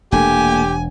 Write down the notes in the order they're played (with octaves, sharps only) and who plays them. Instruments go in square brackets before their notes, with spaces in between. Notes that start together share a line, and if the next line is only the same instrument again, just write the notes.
[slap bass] E1 C#4 D4 [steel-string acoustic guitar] A#2 A3 A#3 [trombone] G4 [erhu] G#5